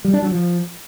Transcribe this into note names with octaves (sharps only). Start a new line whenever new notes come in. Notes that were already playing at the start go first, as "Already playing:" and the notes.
G3
D4
F#3
F3